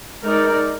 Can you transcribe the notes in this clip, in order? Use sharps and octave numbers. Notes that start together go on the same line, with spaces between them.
G#3 D#4 A#4 D5